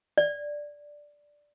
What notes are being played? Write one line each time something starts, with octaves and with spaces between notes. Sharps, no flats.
D5